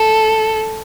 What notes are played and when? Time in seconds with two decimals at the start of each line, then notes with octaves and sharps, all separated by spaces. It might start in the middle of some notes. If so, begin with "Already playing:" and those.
Already playing: A4